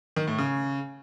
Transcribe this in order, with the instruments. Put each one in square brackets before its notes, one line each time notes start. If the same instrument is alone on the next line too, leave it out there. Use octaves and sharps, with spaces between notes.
[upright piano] D#3
A2
C#3